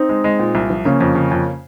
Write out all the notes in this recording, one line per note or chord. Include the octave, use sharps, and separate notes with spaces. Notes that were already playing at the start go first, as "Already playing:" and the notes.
Already playing: C4 D#4
G#3
G#3
A#2
C2
F3
C#3 A#3 C#4
F2
C#3
F2